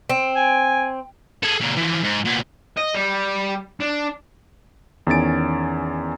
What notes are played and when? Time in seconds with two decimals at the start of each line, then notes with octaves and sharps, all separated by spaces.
0.09 C4
0.36 G#5
1.43 G#4 A4
1.61 A#2 C#3
1.77 E3 F3
2.04 G#2
2.25 A#2 B3
2.77 D#5
2.94 G3
3.80 D4
5.07 E2 D#3 C#4 G#5 A6 D7